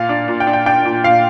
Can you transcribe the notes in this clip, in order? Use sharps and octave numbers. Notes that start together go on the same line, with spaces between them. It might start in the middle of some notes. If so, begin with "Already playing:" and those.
Already playing: A#2 F5
D4
A#2
G5
D4
G5
D4 G5
A#2
A#2 F5